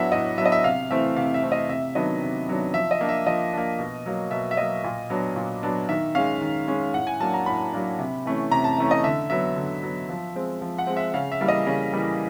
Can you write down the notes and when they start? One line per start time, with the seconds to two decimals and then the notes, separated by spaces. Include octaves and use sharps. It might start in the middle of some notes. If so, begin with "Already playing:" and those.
Already playing: A2 F#3 B3 D4 E5 F#5
0.12 A2 D#5
0.38 F#3 E5
0.41 B3 D4 D#5
0.52 E5
0.64 C3 F5
0.91 E3 A3 C4 E5
1.17 C3 F5
1.34 E5
1.43 E3 A3 C4
1.52 D#5
1.69 C3 E5
1.95 D#3 F#3 B3 D4 D#5
2.21 C3
2.48 D#3 F#3 B3 D4
2.74 F3 E5
2.91 D#5
3.01 A#3 D4
3.09 E5
3.27 F3 D#5
3.53 A#3 D4
3.79 B2
4.06 F#3 A#3
4.31 B2 E5
4.51 E5
4.57 F#3 A#3 D#5
4.84 A#2
5.10 F#3 B3 D4
5.36 A#2
5.63 F#3 B3 D4
5.89 D#3 E5
6.15 G#3 C#4 F5
6.41 D#3
6.67 G#3 C#4
6.94 A2 F#5
7.07 G#5
7.20 F#3 A#3 D4 A5
7.34 A#5
7.46 A2 B5
7.73 F#3 A#3 D4
7.99 C3
8.25 E3 A3 C#4
8.51 C3 A#5
8.64 A5
8.78 E3 A3 C#4
8.91 D#5
9.04 D3 E5
9.30 F#3 B3 E5
9.56 D3
9.83 F#3 B3
10.09 F3
10.35 G#3 C4
10.62 F3
10.78 F#5
10.87 G#3 C4
10.97 E5
11.14 C#3 F5
11.32 E5
11.40 E3 G3 A#3
11.48 D#5
11.66 C#3
11.93 E3 G3 A#3